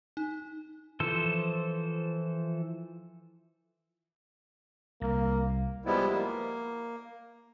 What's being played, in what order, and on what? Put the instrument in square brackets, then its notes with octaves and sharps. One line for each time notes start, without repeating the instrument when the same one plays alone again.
[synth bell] D#4
[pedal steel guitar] E3 F3 A4 C5
[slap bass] C2 [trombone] A#3
[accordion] F3 G3 G#3 B3 E4
A#3